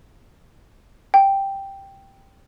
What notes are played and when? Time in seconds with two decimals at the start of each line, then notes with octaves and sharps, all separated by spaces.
1.14 G5